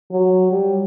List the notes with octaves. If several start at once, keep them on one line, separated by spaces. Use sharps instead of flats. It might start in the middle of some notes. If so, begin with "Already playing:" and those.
F#3
G3